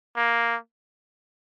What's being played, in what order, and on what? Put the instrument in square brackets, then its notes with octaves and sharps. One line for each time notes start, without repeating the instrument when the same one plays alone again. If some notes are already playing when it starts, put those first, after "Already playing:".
[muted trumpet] A#3